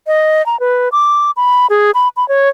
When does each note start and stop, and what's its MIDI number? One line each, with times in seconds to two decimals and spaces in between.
0.07 0.44 75
0.46 0.59 82
0.60 0.89 71
0.92 1.31 86
1.36 1.67 83
1.70 1.91 68
1.94 2.08 83
2.17 2.27 83
2.28 2.49 73